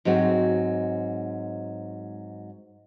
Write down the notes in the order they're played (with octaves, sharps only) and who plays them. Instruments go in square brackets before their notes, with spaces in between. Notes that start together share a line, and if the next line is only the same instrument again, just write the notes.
[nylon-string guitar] G#2 F#3 G#3 C4 F#4